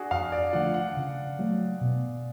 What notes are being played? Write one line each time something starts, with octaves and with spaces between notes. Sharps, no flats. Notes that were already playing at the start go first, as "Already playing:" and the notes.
Already playing: D4 F#4 G#4
F2 F5
D5
D3 F3 A3 F4 F#5
F#5
C#3
F#3 A3
B2